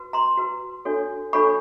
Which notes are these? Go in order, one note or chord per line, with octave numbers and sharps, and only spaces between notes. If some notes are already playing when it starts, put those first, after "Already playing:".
Already playing: F#4 B4
A#5 C6
F#4 B4
D4 F#4 A4 C#5
D4 F#4 A4 C#5 B5 C#6